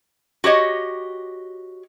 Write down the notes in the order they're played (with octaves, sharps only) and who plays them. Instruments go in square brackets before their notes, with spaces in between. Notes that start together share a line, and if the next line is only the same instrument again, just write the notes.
[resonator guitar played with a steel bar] F#4 G4 C#5 D#5